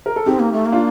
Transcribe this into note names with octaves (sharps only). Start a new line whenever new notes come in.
A#4
A4
C4 D#4 G4
A#3
A3
A#3
D4 F4